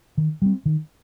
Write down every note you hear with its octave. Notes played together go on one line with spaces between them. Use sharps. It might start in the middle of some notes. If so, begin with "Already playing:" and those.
D#3
G3 C4
D#3